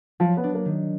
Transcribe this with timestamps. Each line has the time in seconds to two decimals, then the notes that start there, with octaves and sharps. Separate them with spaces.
0.20 F3 F#3
0.37 B3
0.44 D4
0.54 A#3
0.65 D#3